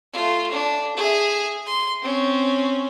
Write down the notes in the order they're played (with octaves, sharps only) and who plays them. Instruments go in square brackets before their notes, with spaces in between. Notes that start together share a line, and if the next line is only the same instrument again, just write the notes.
[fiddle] A3 F4
D4
G#4 E5
C6
C4 C#4